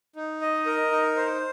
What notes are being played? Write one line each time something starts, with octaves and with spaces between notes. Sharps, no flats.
D#4
D#5
A#4
D#4
C5